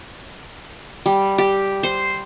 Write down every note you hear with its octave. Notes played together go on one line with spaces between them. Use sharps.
G3
G4
C5